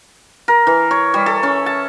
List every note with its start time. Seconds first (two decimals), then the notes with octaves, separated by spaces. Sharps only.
0.48 A#4
0.67 E3
0.91 C#5
1.14 G3
1.26 A4
1.43 C#4
1.66 A5